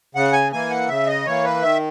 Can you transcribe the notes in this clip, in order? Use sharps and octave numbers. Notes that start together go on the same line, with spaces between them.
C#3 F#5
G#5
E3 A#3 G#5
F#5
C#3 E5
D#5
E3 A#3 C#5
B4
D#3 E5